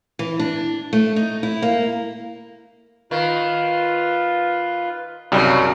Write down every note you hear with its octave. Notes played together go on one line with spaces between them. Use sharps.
E3
D4
A3
D#4
E4
A#3
D#3 F4 B4
C2 F#2 C#3 G3 D#4 E4